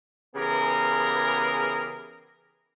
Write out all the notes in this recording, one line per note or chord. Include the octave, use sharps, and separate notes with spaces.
C#3 E3 B3 G4 G#4 A#4